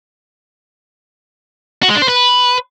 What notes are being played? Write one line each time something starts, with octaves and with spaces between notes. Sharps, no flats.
F#4
G#3
D4
C5
B4